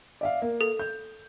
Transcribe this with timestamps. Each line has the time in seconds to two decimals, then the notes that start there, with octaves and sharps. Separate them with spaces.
0.21 D5 E5 F5
0.42 A#3
0.61 A4
0.79 G6